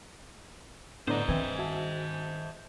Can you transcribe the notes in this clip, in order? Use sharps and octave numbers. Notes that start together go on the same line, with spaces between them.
A2 D3 B3 D4 C5 D5 D#5 A#5
D#3 C4 B4 E5 G#5
F#4 E5 A5